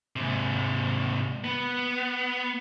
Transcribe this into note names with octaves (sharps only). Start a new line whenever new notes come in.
G#2 C3
B3